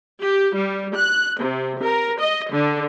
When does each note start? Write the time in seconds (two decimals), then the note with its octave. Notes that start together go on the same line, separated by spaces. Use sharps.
0.22 G4
0.57 G3
0.97 F#6
1.41 C3
1.82 A#4
2.20 D#5
2.51 D3